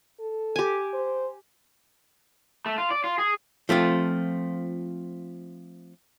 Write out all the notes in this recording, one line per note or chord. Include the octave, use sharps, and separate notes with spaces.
A4
G4 G#5
C5
A3
F4
D5
F4
G#4
F3 A3 C4 F4